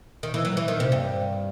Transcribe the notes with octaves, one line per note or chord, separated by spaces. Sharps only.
D#3
E3
F#3
E3
D#3
C3
G2